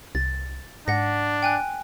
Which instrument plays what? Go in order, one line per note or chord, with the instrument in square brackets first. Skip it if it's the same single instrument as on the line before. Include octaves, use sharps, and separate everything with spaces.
[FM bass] C2 [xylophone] A6
[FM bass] G#2 [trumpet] D4 [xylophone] F#5 A#6
[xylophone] G5 G#5 F#6